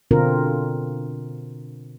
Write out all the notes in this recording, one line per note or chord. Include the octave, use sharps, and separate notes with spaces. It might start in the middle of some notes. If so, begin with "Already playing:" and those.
B2 D3 C4 D4 F4 A#4